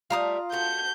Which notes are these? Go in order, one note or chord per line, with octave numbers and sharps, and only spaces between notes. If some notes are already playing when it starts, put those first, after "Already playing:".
G3 A3 F4 F5 A#5 D#6
A3 F#4 G6